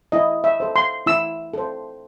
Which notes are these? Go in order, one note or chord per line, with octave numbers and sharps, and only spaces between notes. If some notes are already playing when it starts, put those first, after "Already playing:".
E4 D#5
E5
A4 C5
C6
E4 E6
A4 C5